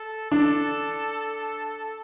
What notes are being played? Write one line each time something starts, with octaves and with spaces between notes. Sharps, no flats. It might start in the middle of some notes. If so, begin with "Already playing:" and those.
Already playing: A4
D4 A4